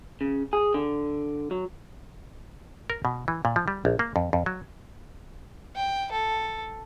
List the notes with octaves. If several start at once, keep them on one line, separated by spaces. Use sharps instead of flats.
C#3
G#4
D3
F#3
A#4
B2
E3
A#2
F3
G3
A#1
A#3
F2
F2
F#3
G5
A4